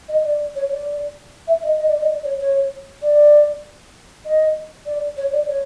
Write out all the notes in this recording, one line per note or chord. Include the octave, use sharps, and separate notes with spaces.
D#5
D5
C#5
D5
E5
D#5
D#5
D5
D#5
D5
C#5
C#5
D5
D#5
D5
C#5
D5
C#5